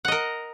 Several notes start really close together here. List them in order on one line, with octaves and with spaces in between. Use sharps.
F#5 D#5 A#4